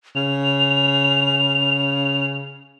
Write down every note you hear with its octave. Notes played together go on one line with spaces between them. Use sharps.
C#3 F7